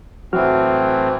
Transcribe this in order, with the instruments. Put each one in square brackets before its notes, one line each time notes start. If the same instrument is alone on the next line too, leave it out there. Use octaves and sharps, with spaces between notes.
[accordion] A2 E3 C4 [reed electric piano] F#3 F#4 F6